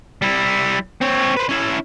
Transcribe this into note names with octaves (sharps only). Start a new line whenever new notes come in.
G3 E4
C4 C#5
B4 C5
C#4 E4